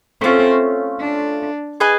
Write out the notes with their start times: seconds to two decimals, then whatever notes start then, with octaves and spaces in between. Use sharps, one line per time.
0.21 A3 C4 C#4 F4
1.00 D4
1.80 G#4 B4 D#5 G#5